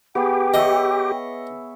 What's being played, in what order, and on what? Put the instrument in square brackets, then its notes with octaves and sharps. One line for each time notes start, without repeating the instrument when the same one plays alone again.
[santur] B3 G#4 D#6 [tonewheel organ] G4 [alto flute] G5
[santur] C#5 E5 D6 [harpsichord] D#5